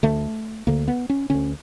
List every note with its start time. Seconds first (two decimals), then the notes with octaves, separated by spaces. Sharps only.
0.03 D2 D3 A3
0.67 D2 D3 A#3
0.88 B3
1.10 C#4
1.30 D2 D3 C#4